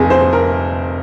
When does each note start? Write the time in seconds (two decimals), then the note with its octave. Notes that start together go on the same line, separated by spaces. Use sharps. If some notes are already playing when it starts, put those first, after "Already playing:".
Already playing: F1 F2 C3 G#4
0.10 C5
0.33 A#4